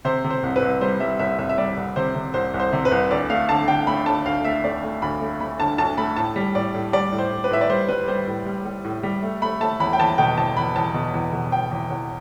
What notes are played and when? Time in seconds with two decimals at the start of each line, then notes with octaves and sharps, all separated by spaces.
0.05 C3 C5
0.24 C3
0.30 C5
0.43 C2
0.56 B4
0.62 C2
0.81 G3 C5
1.00 G3 E5
1.19 C2 E5
1.39 C2 E5
1.49 E5
1.58 G3 D5
1.77 C2
1.96 C3 C5
2.15 C3
2.34 C2 C5
2.54 C2
2.60 C5
2.73 C3
2.85 B4
2.92 C2
3.11 D2 D5
3.30 A3 F5
3.49 D3 A5
3.68 D3 G5
3.87 A3 B5
4.06 D3 A5
4.25 D2 F5
4.44 A3 E5
4.64 A3 D5
4.83 A3
5.02 D2 B5
5.21 A3
5.40 A3 B5
5.59 D3 A5
5.78 D2 A5
5.98 A3 B5
6.17 A2 A5
6.36 G3
6.55 A2 D5
6.74 A2
6.93 G3 D5
7.12 A2
7.18 C5
7.31 A2
7.44 B4
7.51 A2 E5
7.61 D5
7.69 G3 C5
7.89 G3 B4
8.08 G3 C5
8.27 A2
8.46 G3
8.65 G3
8.85 A2
9.03 G3
9.23 A3
9.42 A3 B5
9.60 A3 A5
9.80 E2 B5
9.93 G5
9.99 E2 A5
10.18 B2 G5
10.37 E2 A5
10.57 E2 B5
10.76 E2 A5
10.94 B2
11.14 E2
11.33 B2
11.52 E2 G5
11.71 E2
11.90 E2